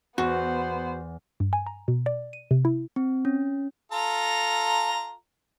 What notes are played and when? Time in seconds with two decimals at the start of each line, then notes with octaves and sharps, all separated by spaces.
0.18 E2 B3 F#4 C5
1.40 G2
1.53 G#5
1.66 A#5
1.88 B2
2.06 D5
2.33 D#7
2.51 C3
2.65 E4
2.96 C4
3.25 C#4
3.92 F4 A4 A#5